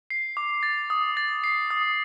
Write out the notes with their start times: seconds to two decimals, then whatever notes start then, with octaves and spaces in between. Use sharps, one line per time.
0.10 C7
0.37 D6
0.63 A6
0.90 D#6
1.17 A6
1.44 C7
1.71 D#6